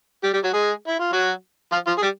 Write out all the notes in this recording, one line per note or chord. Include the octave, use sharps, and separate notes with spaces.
G3 G4
G3 G4
F#3 F#4
G#3 G#4
E4
F4
F#3 F#4
F3 F4
F3 F4
G#4
G3 G4